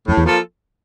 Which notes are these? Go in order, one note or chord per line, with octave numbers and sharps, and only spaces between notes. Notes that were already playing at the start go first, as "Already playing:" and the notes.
F2 A2
E2
F3 A#3 F4 A4